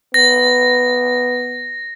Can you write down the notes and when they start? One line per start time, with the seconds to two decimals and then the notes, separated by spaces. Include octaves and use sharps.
0.14 B3 A#6